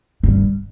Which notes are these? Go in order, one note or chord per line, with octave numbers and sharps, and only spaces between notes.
G2